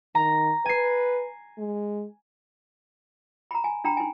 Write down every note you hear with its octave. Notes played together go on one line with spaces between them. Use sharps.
D#3 A#5
B4 G#5 C7
G#3
A#5 B5
G#5
D4 G5 A#5 B5
D#4 G#5